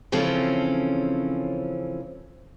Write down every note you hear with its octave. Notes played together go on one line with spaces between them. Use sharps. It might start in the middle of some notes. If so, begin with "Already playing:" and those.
C#3 E3 F3 C4 C#4 A4